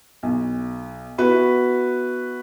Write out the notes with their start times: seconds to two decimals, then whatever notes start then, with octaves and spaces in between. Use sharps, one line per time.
0.23 B1
1.18 B3 E4 F#4 B4